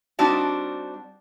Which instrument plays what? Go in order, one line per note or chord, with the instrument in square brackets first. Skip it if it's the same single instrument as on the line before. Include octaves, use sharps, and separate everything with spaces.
[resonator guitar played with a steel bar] G3 C4 D4 D#4 F#4